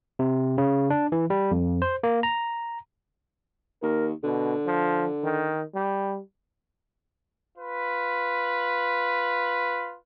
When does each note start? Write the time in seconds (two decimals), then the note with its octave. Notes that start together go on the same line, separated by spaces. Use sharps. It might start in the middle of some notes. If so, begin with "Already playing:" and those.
0.19 C3
0.58 C#3
0.90 D4
1.12 E3
1.30 G3
1.51 F2
1.82 C5
2.03 A#3
2.23 A#5
3.82 D#2 A#4
4.24 B2 D3
4.66 F3
5.24 D#3
5.74 G3
7.56 F4 B4